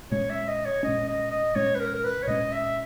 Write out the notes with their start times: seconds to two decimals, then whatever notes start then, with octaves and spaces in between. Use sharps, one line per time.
0.11 A#2 G#3 C#4 C#5
0.29 E5
0.47 D#5
0.65 C#5
0.83 A#2 G#3 C#4 D#5
1.08 D#5
1.31 D#5
1.55 A#2 G#3 C#4 C#5
1.75 B4
1.79 A#4
1.94 A#4
2.04 B4
2.23 C#5
2.27 A#2 G#3 C#4 D#5
2.51 E5